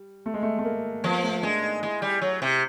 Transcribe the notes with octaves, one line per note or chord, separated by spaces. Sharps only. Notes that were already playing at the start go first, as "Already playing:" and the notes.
Already playing: G3
A3
G#3
A3
A3
A#3
F3 B3
A3
G#3 D4
D#4
G#3 E4
G3
F#3
C3